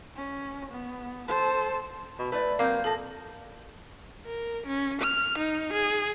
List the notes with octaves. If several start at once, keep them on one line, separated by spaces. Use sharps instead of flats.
C#4
B3
A4 C5
B2
A3 E4 B4 D5
F#3 A#3 C4 F5 G6
F3 A4 A5 A#6
A#4
C#4
F6
D#4
G#4